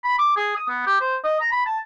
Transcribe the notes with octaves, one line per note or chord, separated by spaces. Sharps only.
B5
D6
G#4
D#6
B3
G4
C5
D#5
A#5
B5
A5